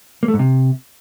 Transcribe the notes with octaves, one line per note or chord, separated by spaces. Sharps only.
A#3
A3
G#2
C3